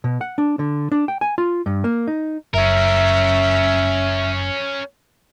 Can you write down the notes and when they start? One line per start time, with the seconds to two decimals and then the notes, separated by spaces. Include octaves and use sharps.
0.04 B2
0.21 F#5
0.38 D4
0.59 D3
0.92 D4
1.08 G5
1.21 G#5
1.38 F4
1.66 G2
1.84 A#3
2.08 D#4
2.54 F#1 C#4 A#4 E5